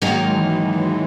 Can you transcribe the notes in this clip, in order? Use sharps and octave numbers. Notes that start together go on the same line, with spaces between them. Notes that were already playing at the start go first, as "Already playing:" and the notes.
G#2 D#3 F#3 A#3 D#4 A#4
G#3
E3
F#3
E3